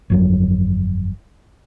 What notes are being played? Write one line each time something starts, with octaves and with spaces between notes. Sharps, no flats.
G1 F2 F#3